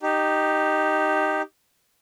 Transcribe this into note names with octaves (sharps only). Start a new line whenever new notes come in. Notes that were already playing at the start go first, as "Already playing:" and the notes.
D#4 G4